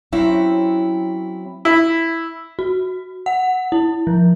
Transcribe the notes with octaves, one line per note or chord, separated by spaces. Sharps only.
F#3 C4 C#4 E4 C#5
E4
F#4
F#5
E4
F3